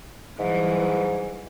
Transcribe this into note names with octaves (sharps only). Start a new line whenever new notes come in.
G#2 E3 F#3 G3